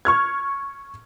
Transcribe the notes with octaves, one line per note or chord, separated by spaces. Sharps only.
C#6 F6 G#6